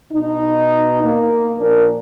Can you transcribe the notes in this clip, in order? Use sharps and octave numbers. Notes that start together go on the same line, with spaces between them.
B2 D#4
A#3
A#2 F3 D4 A#4